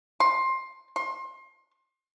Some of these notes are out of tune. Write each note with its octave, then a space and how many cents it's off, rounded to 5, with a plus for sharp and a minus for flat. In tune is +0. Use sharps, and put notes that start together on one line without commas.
C6 +15
C6 +30